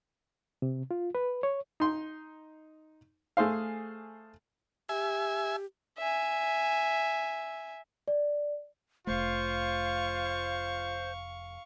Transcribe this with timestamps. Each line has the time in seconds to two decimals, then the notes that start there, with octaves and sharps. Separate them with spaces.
0.62 C3
0.91 F4
1.15 B4
1.43 C#5
1.80 D#4 C6
3.37 A3 G#4 C5 F5
4.89 G4 E5 G#5
5.98 E5 G#5
8.08 D5
9.07 F1 A3 F4 C5 F5 C#6